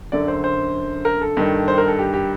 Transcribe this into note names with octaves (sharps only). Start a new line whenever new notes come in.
F#2 D3 D5
C5
C5
A#4
A4
G2 D#3
C5
A#4
A4
G4
G4